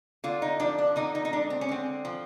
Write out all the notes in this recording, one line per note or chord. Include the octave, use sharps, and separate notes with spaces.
D3 F4
D#4
F3 D4
D4
D3 D#4
D#4
D#4
G#3 D4
C4
C#4
D3 C4
F3